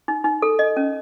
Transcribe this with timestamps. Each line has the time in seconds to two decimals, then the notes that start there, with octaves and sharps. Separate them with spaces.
0.08 D#4
0.24 D#4
0.42 A4
0.59 D#5
0.77 C#4